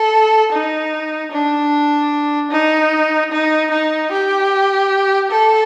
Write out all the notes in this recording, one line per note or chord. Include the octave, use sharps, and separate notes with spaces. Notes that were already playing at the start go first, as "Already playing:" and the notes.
Already playing: A4
D#4
D4
D#4
D#4
D#4
G4
A4